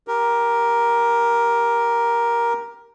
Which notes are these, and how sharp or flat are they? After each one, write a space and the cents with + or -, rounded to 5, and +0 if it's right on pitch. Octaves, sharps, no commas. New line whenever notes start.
G4 +0 A#4 +10